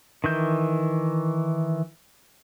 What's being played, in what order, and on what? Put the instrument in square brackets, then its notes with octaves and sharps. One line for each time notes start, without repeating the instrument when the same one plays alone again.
[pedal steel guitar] D#3 E3 G6